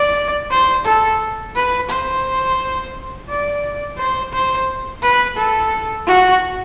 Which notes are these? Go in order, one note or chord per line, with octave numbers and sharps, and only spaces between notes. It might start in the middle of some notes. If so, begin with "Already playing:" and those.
Already playing: D5
C5
A4
B4
C5
D5
C5
C5
B4
A4
F#4